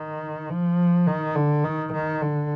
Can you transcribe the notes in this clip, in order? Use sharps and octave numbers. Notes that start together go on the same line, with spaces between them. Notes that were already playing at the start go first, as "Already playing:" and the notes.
Already playing: D#3
F3
D#3
D3
D#3
D#3
D3